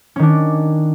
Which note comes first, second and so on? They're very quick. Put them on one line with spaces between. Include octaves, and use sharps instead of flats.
C#4 D#3 D4